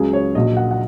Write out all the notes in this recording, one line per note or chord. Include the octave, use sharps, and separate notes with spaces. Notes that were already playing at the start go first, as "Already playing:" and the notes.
Already playing: C#2 C#3 F#3 G#4
C#5
A#1 A#2 F#3 D#5
F#5
F#5